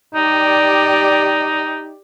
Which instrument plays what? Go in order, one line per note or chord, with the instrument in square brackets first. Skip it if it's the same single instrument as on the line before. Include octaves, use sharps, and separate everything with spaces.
[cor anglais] D#4 [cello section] G4 D5